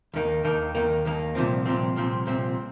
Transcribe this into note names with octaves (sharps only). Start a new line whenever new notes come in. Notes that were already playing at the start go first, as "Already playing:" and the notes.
D#2 D#3 A#3
D#2 D#3 A#3
D#2 D#3 A#3
D#2 D#3 A#3
C2 A#2 F3 C4
C2 A#2 F3 C4
C2 A#2 F3 C4
C2 A#2 F3 C4